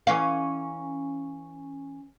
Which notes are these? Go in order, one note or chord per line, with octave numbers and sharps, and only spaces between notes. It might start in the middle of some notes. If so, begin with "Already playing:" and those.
E3 C#4 F5